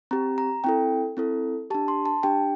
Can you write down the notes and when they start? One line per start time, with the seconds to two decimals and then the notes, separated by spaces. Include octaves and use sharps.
0.11 C4 G4 A#5
0.38 A#5
0.64 C4 E4 A4 G5
1.17 C4 E4 A4
1.70 G4 A5
1.74 D4
1.88 C6
2.06 A5
2.23 D4 G4 G5